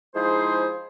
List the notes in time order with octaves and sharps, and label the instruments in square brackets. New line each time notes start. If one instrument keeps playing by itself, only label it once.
[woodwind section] F3 G#3 D#4 E4 G#4 C5